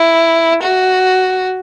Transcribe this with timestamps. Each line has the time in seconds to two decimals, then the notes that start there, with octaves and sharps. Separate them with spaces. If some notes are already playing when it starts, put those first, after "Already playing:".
Already playing: E4
0.62 F#4